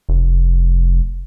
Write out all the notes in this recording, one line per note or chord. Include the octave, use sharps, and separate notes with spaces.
F1